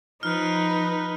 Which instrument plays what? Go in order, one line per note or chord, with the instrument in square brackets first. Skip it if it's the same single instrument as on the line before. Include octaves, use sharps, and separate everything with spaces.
[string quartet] F3 [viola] D#4 B4 [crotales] F6 F#6